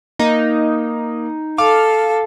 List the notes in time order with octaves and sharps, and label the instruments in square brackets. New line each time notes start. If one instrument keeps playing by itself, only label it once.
[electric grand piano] A#3 [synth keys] D#4
[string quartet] A4 [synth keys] F5 [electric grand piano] D6